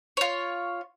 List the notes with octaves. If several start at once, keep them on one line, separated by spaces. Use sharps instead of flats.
F4 C#5